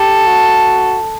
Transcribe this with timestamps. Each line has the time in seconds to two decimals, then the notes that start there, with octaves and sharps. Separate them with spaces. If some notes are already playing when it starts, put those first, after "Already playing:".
Already playing: G4 A4
0.26 F#4